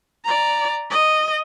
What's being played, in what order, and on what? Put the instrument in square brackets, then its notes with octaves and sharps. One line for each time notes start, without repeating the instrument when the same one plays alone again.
[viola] D5 A#5
D#5